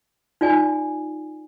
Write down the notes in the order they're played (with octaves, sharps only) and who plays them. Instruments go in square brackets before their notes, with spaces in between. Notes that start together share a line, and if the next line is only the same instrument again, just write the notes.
[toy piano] D#4 F4 D5 G#5